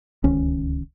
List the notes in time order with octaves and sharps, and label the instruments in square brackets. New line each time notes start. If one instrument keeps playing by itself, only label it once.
[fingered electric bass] D1 C#2 D#3 C#4